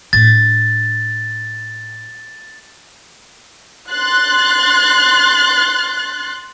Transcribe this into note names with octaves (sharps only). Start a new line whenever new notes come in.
A2 D4 A6
C6 F#6 A6